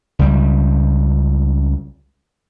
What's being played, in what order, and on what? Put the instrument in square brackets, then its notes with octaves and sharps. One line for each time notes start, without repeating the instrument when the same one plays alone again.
[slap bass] C#2 G3